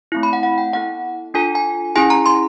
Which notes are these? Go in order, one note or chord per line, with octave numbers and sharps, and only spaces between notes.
A3 C4 E4
B5
F#5
F#5
G5
B3 E4 A4 F#5
D4 F4 A4 G#5
G#5
C#4 E4 G#4 G#5
A#5
C6